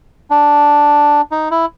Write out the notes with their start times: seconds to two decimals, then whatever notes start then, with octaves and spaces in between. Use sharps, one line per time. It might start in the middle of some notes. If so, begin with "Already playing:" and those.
0.30 D4
1.31 D#4
1.51 E4